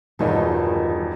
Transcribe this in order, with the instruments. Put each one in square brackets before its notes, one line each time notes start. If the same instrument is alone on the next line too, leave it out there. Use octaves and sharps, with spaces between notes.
[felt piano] E1 E2 D#4 [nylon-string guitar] G2 D#3 F3